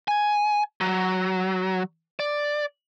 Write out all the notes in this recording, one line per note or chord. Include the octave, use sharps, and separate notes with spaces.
G#5
F#3
D5